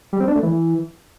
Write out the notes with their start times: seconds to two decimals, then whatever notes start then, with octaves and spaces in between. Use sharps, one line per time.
0.13 G3
0.20 C4
0.28 D4
0.35 A3
0.43 E3